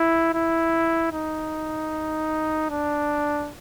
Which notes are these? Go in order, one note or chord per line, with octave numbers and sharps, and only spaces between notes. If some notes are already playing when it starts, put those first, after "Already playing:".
Already playing: E4
E4
D#4
D4